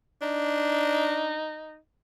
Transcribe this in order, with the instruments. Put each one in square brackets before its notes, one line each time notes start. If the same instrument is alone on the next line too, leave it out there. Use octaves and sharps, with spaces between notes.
[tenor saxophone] D4 [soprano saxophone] D#4